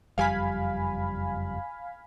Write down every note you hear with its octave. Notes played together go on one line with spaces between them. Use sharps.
F#1 F2 G3 F5 G#5 B5